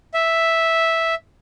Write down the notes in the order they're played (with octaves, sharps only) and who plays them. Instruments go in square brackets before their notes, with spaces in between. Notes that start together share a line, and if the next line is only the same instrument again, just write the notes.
[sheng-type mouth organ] E5